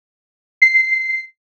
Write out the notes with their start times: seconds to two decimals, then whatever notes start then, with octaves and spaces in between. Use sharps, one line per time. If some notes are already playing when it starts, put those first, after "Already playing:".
0.62 C7